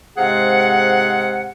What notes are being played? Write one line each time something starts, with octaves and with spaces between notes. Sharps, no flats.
G#2 C3 G#3 G#4 F5 F#5